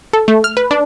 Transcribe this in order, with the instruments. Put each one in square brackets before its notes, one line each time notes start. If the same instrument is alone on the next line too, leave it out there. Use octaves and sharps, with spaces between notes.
[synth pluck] A4
A3
F6
B4
D4